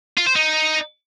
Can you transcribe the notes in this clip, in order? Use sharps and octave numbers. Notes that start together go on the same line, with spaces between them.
F4
C5
D#4